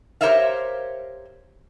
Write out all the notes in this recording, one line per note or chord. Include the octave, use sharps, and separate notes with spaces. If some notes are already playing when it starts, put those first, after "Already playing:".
G4 A#4 C5 C#5 E5 F5